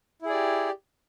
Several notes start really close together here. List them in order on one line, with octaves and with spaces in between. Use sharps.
E4 G#4 D5 G4